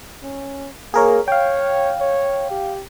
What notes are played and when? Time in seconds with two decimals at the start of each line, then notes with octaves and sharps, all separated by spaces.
0.23 C#4
0.94 A#3 G#4 A#4 C#5
1.28 C#5 F5 G5
2.00 C#5
2.51 G4